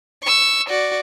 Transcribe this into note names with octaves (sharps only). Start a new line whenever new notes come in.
C#6 E6
F#4 D5